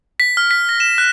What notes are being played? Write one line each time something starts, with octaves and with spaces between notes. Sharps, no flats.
B6
F6
B6
A#6
E7
F#6